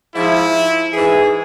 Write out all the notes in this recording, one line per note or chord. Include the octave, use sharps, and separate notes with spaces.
G#2 F3 E4
G#2 E3 G#4